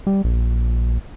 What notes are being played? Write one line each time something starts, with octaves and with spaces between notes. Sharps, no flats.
G3
A#1